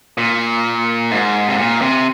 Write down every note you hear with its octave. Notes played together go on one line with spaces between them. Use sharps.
A#2
G#2
C3
A#2
C3